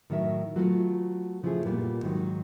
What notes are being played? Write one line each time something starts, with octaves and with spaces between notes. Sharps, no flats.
A2 D#3 F#3 A#4 E5
F#3 A3 B3 F4
C#3 F3 A3 E4 G#4
A#2 G3 A#3 B3
G#2 D#3 F#3